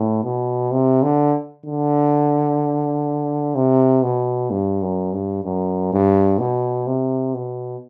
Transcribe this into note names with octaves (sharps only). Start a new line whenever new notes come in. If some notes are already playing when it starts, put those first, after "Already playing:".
Already playing: A2
B2
C3
D3
D3
C3
B2
G2
F#2
G2
F#2
G2
B2
C3
B2